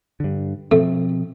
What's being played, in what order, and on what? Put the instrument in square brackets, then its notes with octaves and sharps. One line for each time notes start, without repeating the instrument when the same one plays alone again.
[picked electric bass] G2 D3
[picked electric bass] B2 F3 C4 [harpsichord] A3